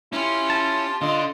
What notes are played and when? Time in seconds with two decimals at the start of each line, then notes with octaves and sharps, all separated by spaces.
0.13 C#4 E4 F4 G4
0.50 A5
1.02 D3 F4 D#5 C6